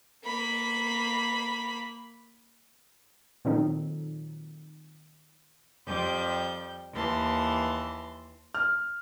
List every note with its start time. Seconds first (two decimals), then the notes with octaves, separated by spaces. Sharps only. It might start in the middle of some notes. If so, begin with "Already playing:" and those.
0.25 A#3 B5
3.45 A#2 D#3 F#3 C4 D#4 A4
5.86 F2 G3 G6
6.93 D#2 E3 A5 C6
8.55 F6